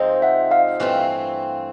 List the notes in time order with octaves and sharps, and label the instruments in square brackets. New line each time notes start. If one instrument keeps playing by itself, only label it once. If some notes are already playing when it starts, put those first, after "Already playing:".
Already playing: [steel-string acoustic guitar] G#2 F3 G#3 C4 D#4
[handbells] E5 F#5
D#5 F5
[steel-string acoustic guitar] G2 E3 A3 C4 F4